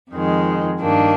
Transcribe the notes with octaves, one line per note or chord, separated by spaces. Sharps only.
F2 D#3 G#3
G2 D#3 A#3 D4